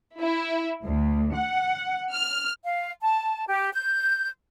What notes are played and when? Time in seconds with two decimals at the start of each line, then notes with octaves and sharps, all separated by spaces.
0.20 E4
0.85 D2
1.34 F#5
2.11 F6
2.64 F5
3.01 A5
3.47 G4
3.73 G6